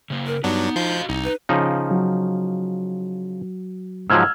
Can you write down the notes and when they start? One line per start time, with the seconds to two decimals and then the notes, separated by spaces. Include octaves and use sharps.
0.10 C#3 A#3
0.27 A#4
0.44 G2 F#3 B3 D4 D#4
0.76 F3 F#4 D#5 F5 G6
1.09 C2 D#4
1.24 B4
1.49 C#3 F3 D#4
1.91 F#3 F#4
4.10 G#2 F3 F#3 E6 F6 G#6